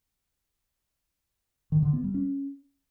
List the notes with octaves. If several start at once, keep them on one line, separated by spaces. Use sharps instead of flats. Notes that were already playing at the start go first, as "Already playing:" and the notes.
D#3
D3
B3
G3
C#4